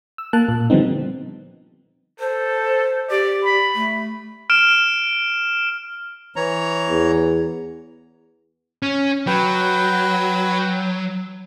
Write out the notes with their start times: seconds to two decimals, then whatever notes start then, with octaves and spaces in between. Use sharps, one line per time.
0.18 E6
0.33 A#3 A5 F#6
0.48 A#2
0.70 D3 F3 G3 B3 C4 D#4
2.20 A4 C5
3.10 G4 D5
3.44 B5
3.75 A3
4.50 F6 D7 E7
6.36 E3 C#5 A#5
6.89 E2
8.83 C#4
9.27 F#3 B4 G5